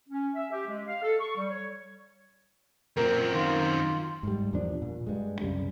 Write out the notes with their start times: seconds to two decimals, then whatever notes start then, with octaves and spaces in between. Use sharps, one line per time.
0.09 C#4
0.35 E5
0.52 G4
0.67 G#3
0.87 F5
1.03 A4
1.20 C#6
1.36 G3
1.50 C#5
2.97 F#2 A#2 C4 A#4
3.34 D#3 F4
4.23 G#2 G3
4.53 E2 A#2 F3 D4
4.82 A#2
5.07 G2 G#3
5.41 C2 F#2 C#3 G3